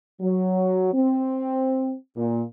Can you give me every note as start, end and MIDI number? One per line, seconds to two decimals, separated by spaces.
0.21 0.93 54
0.93 1.96 60
2.16 2.43 46